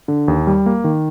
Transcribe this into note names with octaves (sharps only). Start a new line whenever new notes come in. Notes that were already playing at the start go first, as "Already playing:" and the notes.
D3
D#2
G3
A#3
D#3